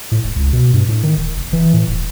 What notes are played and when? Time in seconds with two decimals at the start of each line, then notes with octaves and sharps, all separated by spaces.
0.12 A2
0.24 E1
0.36 C#2
0.53 B2
0.73 G2
0.88 A2
1.03 D#3
1.17 D#1
1.37 F1
1.53 E3
1.73 A2
1.88 D#1